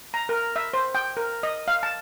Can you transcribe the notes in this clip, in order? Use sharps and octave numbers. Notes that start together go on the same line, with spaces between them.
A#5
A#4
E5
C5
G5
A#4
D#5
F5
A5